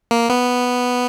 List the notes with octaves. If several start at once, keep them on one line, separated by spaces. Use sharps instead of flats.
A#3
B3